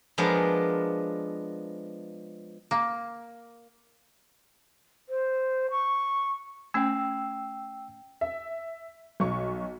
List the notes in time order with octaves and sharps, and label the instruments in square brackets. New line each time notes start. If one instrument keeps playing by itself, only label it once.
[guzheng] F3 G#3 B3 D4 A#4
[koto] A#3
[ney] C5
C#6
[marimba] A3 C#4 [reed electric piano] G5 E6
[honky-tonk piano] E5
B1 C#6